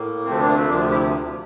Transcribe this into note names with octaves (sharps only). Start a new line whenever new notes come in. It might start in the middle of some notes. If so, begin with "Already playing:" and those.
Already playing: A2 A#3
D2 C3 F3 A3 C4
A#3 D4
A3 C4
D2 C3 F3 A#3 D4
E4 G4